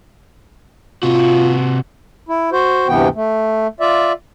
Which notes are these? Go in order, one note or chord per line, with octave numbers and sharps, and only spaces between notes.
C3 F4 F#4
E4
F#4 C5
D2 G2 C3 E3 B3 G5
A3
F4 D5 E5